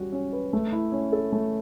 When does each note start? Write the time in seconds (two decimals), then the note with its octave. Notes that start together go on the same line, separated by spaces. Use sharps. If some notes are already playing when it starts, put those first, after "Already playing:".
Already playing: G3 C#4 F#4
0.12 C#4
0.33 B4
0.53 A3
0.72 E4
0.92 C#4
1.12 A4
1.32 A3